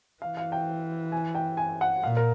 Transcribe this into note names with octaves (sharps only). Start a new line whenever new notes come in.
E3 F5
F5
G5
G#5
G5
G#5
F#5
A#2 F5
A#4